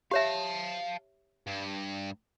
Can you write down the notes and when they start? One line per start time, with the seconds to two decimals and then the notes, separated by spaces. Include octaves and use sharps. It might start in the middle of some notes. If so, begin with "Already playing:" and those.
0.11 G4 C#5 E5 F5 A5
1.47 G2